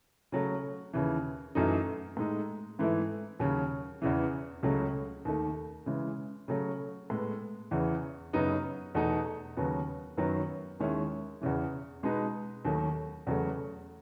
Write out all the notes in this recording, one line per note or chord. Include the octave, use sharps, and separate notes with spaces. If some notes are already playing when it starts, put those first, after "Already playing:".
C#3 F#3 A3
D#2 C#3 E3
F#2 E3 A3 D#4
A2 G#3 D#4
G#2 E3 A3 E4
D#2 C#3 F#3 C#4
E2 C#3 E3
C#2 C#3 F#3 A3
D#2 D#3 A3
C#3 E3 G#3
C#3 F#3 A3
A2 G#3 B3
E2 C#3 E3
F#2 C#3 F#3 B3 D#4
E2 B2 A3 D#4
D#2 C#3 F#3 B3
F#2 D#3 F#3 B3
D#2 D#3 G#3 C#4 E4
E2 C#3 E3
B2 G#3 B3 D#4
D#2 D#3 F#3 A3
E2 C#3 F#3 A3